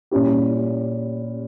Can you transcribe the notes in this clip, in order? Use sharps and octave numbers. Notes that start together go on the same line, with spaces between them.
A#2 G3 C#4 E4 G4